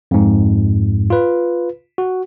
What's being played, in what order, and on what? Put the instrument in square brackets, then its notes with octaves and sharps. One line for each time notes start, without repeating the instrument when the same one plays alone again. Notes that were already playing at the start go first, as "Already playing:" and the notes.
[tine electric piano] F2 G#2
F4 B4
F#4